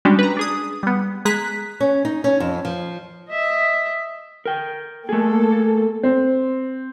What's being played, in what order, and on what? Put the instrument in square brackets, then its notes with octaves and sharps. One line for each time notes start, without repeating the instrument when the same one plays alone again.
[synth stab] G3 G#3 C#4 D4 F#4 G4
B4 A#5
D4 G#4 D#6
G3 B3
G#3 G#4 A#5 F#6 B6
[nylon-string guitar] C#4
D#4
C#4
F2
F3
[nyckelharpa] D#5 E5
[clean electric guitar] A#4 G5
[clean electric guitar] A3 G#4 [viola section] A#3 A4
[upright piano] C4